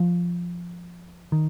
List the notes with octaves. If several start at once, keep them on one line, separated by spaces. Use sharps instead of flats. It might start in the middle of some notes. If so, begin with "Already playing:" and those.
Already playing: F3
D#3